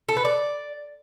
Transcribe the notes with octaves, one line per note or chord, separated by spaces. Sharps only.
A4
B4
D5